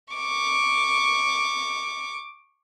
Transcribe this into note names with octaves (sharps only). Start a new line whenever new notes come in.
C#6 D6